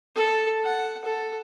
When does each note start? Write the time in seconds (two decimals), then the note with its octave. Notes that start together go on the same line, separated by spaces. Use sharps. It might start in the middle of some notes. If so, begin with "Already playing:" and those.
0.15 A4
0.64 F#5
1.04 A4